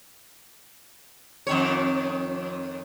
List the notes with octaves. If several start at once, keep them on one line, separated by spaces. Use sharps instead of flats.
F2 D#3 C#5